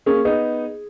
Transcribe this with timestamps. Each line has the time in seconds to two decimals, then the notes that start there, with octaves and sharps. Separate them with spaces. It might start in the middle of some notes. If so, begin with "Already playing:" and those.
0.06 A#3 C#4 G#4
0.25 B3 D#4 G#4